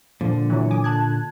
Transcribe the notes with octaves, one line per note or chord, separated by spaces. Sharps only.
A#2 D3 F3
E3 F#3
G#5 D6 D#6
A5 F#6 G#6